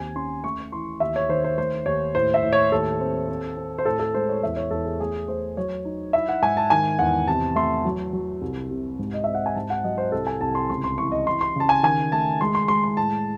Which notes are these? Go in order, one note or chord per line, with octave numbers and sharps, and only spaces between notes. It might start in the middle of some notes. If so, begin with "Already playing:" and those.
Already playing: D#2 C4 G#5
C#4 C6
A3 C#6
E3 C6
D#2 E5
C#5
D#3 C5
C5
A3 C5
D#2 C#5
A2 C5
E5
A2
C#5
D#2 A4
C4
C4
C4
C5
A2 A4
A4
G#3 C5
C#5
E2 E5
C#5
E2 A4
G#4
A3 G#4
A3 C5
F#3 C#5
D#4
E4 E5
F#5
G#2 G#5
A5
D#3 G#5
E2 F#5
C3 A5
A3 C6
F#3
F#3
C2
C3
G#2
D#5
C4 E5
F#5
G#5
G#2 A5
F#5
F#3 D#5
C5
C2 A4
G#5
C2 A5
C6
C#2 C6
C6
E3 C#6
D#5
E3 C6
C6
C#3 A5
G#5
D#3 G#5
A3 A5
G#3 C6
C6
G#3 C6
C6
A2 A5